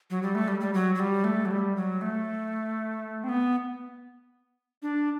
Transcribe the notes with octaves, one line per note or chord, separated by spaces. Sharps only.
F#3
G3
A3
G3
G3
F#3
F#3
G3
A3
F#3
G3
F#3
A3
C4
B3
D4